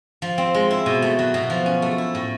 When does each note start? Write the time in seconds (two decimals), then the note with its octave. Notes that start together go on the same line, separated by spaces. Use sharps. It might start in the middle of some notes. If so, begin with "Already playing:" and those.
0.22 F3
0.38 C4
0.54 G#3
0.71 E4
0.86 B2
1.02 A3
1.19 F#3
1.34 B2
1.50 F3
1.66 C#4
1.82 A3
1.98 E4
2.15 A2